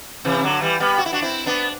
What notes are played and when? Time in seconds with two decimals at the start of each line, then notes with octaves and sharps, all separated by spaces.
0.25 C3 E3
0.44 D3 F#3
0.61 E3 G3
0.80 G3 B3
0.98 F#4
1.06 E4
1.12 D4 F#4
1.22 C4 E4
1.46 B3 D4